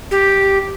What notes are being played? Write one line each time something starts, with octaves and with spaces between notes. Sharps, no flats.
G4